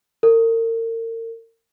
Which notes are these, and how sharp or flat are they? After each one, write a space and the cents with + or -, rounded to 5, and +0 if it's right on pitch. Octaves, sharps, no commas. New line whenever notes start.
A#4 -40